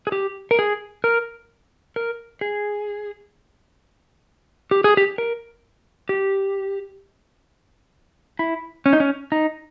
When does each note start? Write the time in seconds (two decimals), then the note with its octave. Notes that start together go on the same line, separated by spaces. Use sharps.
0.07 G#4
0.12 G4
0.51 A#4
0.59 G#4
1.04 A#4
1.96 A#4
2.41 G#4
4.71 G4
4.84 G#4
4.97 G4
5.18 A#4
6.09 G4
8.39 E4
8.86 C#4
8.93 D#4
9.00 C#4
9.32 D#4